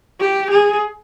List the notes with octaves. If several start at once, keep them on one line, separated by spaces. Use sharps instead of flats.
G4
G#4